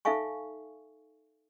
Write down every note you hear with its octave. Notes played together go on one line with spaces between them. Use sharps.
D#4 A4 E5 F5 G#5 C#6